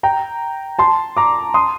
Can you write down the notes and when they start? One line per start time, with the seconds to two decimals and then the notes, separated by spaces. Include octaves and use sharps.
0.03 G5 A#5
0.79 A5 C6
1.17 A#5 D6
1.54 C6 D#6